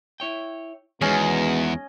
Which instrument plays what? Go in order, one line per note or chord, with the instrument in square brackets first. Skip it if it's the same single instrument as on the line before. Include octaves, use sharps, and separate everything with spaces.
[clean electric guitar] E4 C#5 G5
[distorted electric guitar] E2 [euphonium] B2 [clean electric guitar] D#3 G#3 F#4 [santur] C#4 D#5